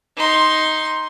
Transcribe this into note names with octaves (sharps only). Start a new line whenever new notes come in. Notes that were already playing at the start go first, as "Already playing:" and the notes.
D#4 C6